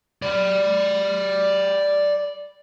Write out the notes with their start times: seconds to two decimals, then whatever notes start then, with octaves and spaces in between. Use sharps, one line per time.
0.22 D5 B5